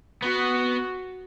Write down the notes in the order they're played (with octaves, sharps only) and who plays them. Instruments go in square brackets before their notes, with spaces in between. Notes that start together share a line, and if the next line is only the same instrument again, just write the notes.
[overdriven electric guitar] B3 [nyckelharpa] F#4